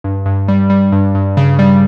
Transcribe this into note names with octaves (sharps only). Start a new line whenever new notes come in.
G2
G2
G3
G3
G2
G2
C#3
G3